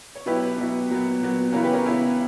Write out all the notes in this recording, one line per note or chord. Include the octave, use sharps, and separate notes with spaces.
C#5
B2 F#3 B3 E4 G4 B4
B2 F#3 B3 E4
A#2 F#3 B3
A#2 F#3 B3
C#3 E3 B3 E4 A#4 C#5
G4 B4
A#4 C#5
C#3 E3 B3 E4